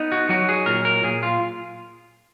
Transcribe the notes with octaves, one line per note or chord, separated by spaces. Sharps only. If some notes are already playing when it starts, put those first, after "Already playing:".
Already playing: B3 D#4
F#4
F#3 F#4
G#4
A#2 A#4
A#4
A#2 G#4
F4